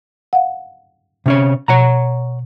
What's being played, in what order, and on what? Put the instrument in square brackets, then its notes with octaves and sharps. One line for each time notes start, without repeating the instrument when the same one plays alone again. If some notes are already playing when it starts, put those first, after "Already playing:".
[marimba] F5 F#5
[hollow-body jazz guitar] C3 C#4 C#5
[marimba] B2 [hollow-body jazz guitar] C#5 F#5 A#5